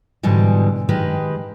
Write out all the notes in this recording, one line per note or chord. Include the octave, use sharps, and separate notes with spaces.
G#2 B2 D3 E3 G3 G#3
D#3 G#3 G4 B4